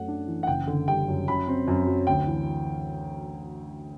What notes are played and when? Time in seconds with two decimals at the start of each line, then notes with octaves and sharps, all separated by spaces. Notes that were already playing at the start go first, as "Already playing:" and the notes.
Already playing: F#2 A3 F#5
0.08 D4
0.27 E3
0.43 F#5
0.47 F#1 G5
0.67 D3
0.87 G3 G5
1.08 F#2
1.28 F#2 B5
1.48 C4
1.68 F#2
1.87 F#3
2.07 D2 G5
2.27 E3